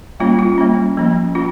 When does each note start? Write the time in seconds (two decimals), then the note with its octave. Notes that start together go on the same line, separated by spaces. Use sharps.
0.20 G3 A#3 C#4 F4
0.39 F4
0.58 G3 A#3 C#4
0.97 F3 A#3 C#4
1.35 C#4 F4